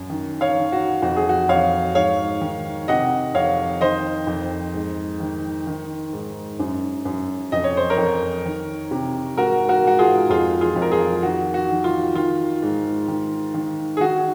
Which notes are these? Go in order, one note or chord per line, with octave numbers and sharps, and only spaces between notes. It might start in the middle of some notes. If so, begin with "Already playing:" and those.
Already playing: F#2
D#3
C#5 F5
D#3
F#4
F2 F#4
G#4
F#4
F2 C#5 F5
G#2 C#5 F5
D#3
C3 D#5 F#5
F2 C#5 F5
D#3 C5 D#5
F2
G#2
D#3
D#3
G#2
F#2
F#2
F2 D#5
C#5
C5
A#4 C#5
F2
D#3
C3
G#2 F#4 A#4
F#4 A#4
G#2 F#4
F4 G#4
F2 F4 G#4
F4 G#4
F2
A#4
F4 G#4
D#3 F#4
F#4
D#3
F4
D#3 F4
G#2
D#3
D#3
G#4
D#3 F#4